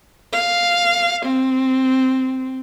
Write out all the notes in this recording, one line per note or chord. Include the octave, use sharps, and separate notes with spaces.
F5
C4